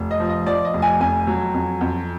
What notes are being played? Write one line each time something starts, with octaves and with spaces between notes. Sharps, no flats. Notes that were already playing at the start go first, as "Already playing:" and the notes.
Already playing: F1
D#5
F3
D#5
F3 D5
D#5
F1
G#5
F2 G#5
F#3
F2
F2